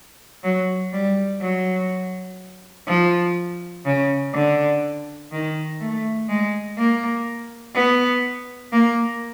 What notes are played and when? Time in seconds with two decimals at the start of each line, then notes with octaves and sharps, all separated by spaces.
0.44 F#3
0.93 G3
1.41 F#3
2.88 F3
3.86 C#3
4.35 D3
5.32 D#3
5.80 A3
6.29 G#3
6.78 A#3
7.76 B3
8.73 A#3